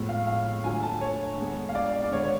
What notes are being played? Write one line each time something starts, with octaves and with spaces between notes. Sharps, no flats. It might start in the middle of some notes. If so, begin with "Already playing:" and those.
Already playing: A2 F3 G#3 B3
F5
F5
D3 F#3 A3 G#5
A5
C#5
D3 G#3 B3
F5
D5
D5
D5
D3 G#3 B3 C#5
C#5